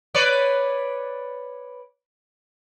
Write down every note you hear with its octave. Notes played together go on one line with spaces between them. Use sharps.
B4 C#5 D5